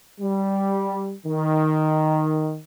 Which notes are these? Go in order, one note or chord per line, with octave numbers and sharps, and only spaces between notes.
G3
D#3